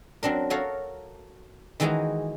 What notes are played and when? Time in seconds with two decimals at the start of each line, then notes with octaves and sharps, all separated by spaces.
0.23 F#3 C4 D4 A#4
0.50 F#4 A4 A#4 C#5 F5
1.80 D#3 E3 G#3 D#4 F#4 G#4